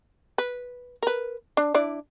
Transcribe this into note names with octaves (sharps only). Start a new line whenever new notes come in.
B4
A#4 B4
D4
D4 E4 D5